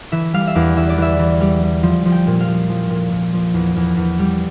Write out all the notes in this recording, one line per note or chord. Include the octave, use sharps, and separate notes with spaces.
E3 E5
G3 F5
E5
E2 D5
E3 E5
D5
E3 E5
E3
G3
G3
F3
F3
G5
A#2
F5
F3
F3
A#2
A#2
F3
E2
E2
E2
G3